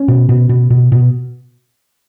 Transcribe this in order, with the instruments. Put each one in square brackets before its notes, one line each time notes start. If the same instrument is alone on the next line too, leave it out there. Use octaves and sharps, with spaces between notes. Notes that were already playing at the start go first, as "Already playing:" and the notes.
Already playing: [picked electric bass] C#4
B2
B2
B2
B2
B2